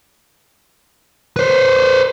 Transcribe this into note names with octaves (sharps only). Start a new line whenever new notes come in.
B4 C5